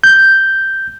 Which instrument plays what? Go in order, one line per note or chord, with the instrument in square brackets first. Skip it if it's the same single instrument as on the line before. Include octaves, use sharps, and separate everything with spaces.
[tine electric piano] G6